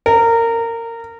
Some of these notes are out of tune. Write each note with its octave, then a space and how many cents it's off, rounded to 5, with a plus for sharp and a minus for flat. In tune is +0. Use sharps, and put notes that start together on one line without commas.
A#4 -20